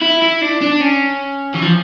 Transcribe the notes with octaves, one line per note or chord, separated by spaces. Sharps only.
E4
E4
D4
D4
C#4
E3
F3